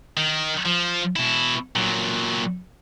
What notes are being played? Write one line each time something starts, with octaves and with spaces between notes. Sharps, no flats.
D#3
F3
B2 E4
A#2 F#3